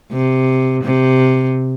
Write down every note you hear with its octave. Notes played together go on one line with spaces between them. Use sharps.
C3
C3